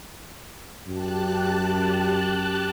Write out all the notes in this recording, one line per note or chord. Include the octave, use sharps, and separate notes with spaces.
F#2 G4 A5 F#6